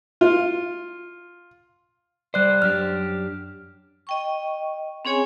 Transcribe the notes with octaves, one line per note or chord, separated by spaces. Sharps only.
F4
G3 C5 D5 F#6
F#2 D4 G4 F6
D#5 G5 C#6
C4 C#4 G#4 C#5 G#5